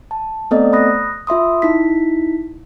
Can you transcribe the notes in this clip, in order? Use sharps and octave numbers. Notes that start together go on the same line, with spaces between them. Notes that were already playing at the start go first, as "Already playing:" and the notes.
A5
A3 B3 C4 A4 D5 D#5
B5 D#6 F#6 A#6
F4 E5 C6 D#6
D#4 E4 B6